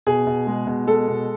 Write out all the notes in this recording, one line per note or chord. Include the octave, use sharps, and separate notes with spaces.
B2 G#4
B2
G#3
B2
G#3 A4
B2